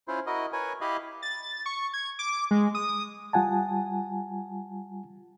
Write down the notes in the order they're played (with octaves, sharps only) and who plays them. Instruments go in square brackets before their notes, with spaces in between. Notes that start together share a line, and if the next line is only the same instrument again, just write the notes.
[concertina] C#4 E4 F4 C5
E4 F#4 A#4 D#5
A#4 B4 C#5 G#5
E4 G4 D#5 F5 B5
[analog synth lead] A6
C#6
G#6
D6
G#3
D#6
[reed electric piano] G3 F4 F#5 G#5 A5